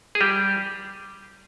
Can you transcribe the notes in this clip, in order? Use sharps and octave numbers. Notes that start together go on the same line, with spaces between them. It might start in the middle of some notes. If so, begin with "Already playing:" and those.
G#4
G3 G4